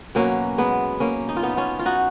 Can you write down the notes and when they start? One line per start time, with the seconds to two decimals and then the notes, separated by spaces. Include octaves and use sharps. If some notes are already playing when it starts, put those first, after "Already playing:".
0.15 B2 F#3 A#3 C#4
0.58 G#3 B3
1.00 A#3 C#4
1.29 D#4
1.37 F4
1.43 B3 D#4
1.57 C#4 F4
1.79 F4
1.85 D#4 F#4